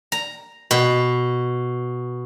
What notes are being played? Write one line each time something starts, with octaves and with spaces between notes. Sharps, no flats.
A#5
B2